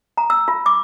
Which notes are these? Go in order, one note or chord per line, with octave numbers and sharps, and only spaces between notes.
A#5
E6
F4
D6